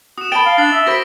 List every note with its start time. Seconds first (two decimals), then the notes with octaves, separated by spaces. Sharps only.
0.18 F#4 D#6 E7
0.32 G5 A5 B5 A6 D7 G7
0.46 F5
0.58 D4 A6 C7 F#7
0.72 E5
0.87 F#4 C5 B5 A#6 B6 D7